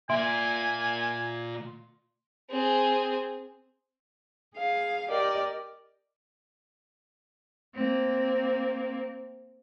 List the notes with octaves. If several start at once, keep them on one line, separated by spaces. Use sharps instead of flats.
A#2 A#4 E5 G#5 C6 D7
C4 G#4
G#4 F5
G4 A#4 D5 D#5
A#3 C4